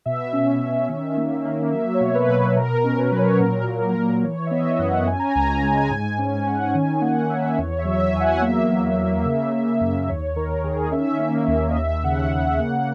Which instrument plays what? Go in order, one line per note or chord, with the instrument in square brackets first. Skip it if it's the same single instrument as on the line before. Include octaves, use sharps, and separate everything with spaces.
[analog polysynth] B2 E5
C#4
C#4
D#3 E5
A#3
A#3
F#3 E5
C#5
B2
B4
B2
B2 A#4
A#4
C#4
B4
F#3
C#5
A#2 A#4
A#3
A#4
F#3
E3 C#5
E5
B3 D#5
F#2 F#5
C#4 G#5
A#5
C#2 G#5
A#5
G#5
G#3 A#5
G#5
G#2 G#5
C#4 G#5
C#4 F#5
D#3 G#5
A#3 F#5
D#3 E5
E2 C#5
E5
F#3
E5
E2 G#5
F#5
F#5
A#3 E5
F#3
A#3
C#3
C#3
F#2
D#2 C#5
D#3 A#4
D#3 G#4
C#4 E5
A#3
D#2
D#5
D#2 E5
C#3 F#5
C#3 F#5
A#3 F#5